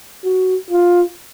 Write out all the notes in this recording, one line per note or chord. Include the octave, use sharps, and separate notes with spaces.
F#4
F4